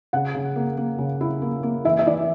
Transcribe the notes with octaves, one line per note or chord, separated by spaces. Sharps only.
C#3 F#5
C#3
A#3
A#3
C#3
E4
A#3
A#3
E3 E5
E5
E3 D5